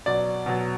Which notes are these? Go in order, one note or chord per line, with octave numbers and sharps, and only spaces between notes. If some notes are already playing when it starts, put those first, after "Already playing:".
B2 F#3 D5
B2 F#3